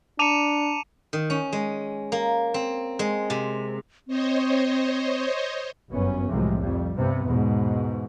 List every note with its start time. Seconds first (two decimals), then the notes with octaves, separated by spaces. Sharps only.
0.19 D4 A5 A#5 D6 C#7 D#7 F7
1.13 D#3
1.30 C#4
1.53 G#3
2.12 A#3
2.54 C4
2.99 G#3
3.30 C3
4.08 C4 C5 C#5 D#5
5.90 G1 F#2 B3 C#4
6.29 C2 F#2 A2 C3 F3 G#3
6.59 F2 G3
6.96 G2 C3 B3
7.27 E2 G#2 B2